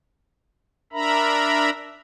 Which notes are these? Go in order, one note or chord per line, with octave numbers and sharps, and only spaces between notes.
D4 A#4 E5 A#5 B5